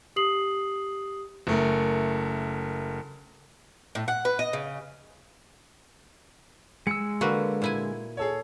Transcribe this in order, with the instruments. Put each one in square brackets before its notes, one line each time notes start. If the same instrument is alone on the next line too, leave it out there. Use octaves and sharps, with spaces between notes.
[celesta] G4 D#6 C7 F#7
[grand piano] F#1 A3 A#4
[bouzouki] A2
F#5
B4
D#5
C#3
[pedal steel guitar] G#3 E6 [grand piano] C#7
[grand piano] D3 [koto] A#3 F#4 B4
[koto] A#2 E4 G#5
[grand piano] G#4 A4 C#5